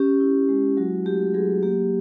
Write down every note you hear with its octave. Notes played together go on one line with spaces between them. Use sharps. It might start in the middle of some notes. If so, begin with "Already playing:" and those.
Already playing: C#4 G4
E4
G#3
F#3 F#4
A3 G4
F#3 G#4
A#3 G4